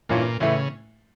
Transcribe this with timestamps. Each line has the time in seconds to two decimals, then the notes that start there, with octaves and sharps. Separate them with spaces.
0.09 G2 A#2 E3 A#3 C#4 F4
0.40 A2 C#3 E3 A3 E4